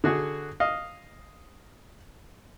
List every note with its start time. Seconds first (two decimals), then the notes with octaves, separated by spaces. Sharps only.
0.04 D3 F#4 G#4
0.60 D#5 F5